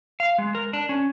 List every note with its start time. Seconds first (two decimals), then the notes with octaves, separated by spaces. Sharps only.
0.20 F5
0.38 G#3
0.55 A#4
0.73 D4
0.89 C#4